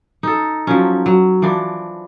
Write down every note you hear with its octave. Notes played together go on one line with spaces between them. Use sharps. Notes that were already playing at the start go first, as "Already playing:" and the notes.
D#4 A4
F3 F#3 C#4
F#3
E3 F3 D4